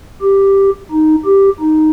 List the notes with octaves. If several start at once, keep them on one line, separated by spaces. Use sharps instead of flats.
G4
D#4
G4
D#4